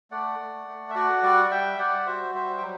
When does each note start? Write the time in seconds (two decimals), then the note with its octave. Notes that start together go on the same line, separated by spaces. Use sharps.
0.11 A3 D5 F#5
0.39 A3
0.68 A3
0.90 E5
0.95 F#4 D5 F#5
1.23 G3 D5 F#5
1.43 F#5
1.50 G3 E5 G5
1.78 G3 D5 F#5
1.98 D5
2.06 F#4 C5 E5
2.34 G3 C5 E5
2.58 G5
2.62 F#3